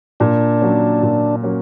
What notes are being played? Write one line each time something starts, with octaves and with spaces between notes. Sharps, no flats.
A#2 D4
F#3 A#3 C#4
A#2
F#3 A#3 C#4